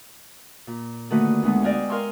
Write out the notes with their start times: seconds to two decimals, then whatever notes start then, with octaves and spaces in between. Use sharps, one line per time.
0.67 A#2
1.10 D3 D#3 A3 A#3 F#4 B4
1.43 D2 G#3 B3 A4
1.62 D5 D#5 F5 G5 G#5
1.89 A#4 F5 G#5 C6 C#6 E6